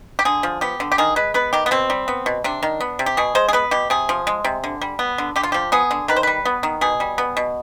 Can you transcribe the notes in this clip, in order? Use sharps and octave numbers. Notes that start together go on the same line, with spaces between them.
G4
D3 G#4
F3
B3 G4
D3
G4
D#3 G#4
G#3 B4
B3 B4
D#3 G4
B3
B2 C4
G3
B3
B2
C3 D4
D#3
B3
C3
G4
B2 G#4
G#3 C5
G#4
B3 B4
B2 G4
C3 G#4
F3
G#3
C3
D3
G3
B3
D3
D3 G4
F4
F3 G4
B3 G#4
D3
D#3 B4
C5
G3 B4
B3
D#3
B2 G#4
G3
B3
B2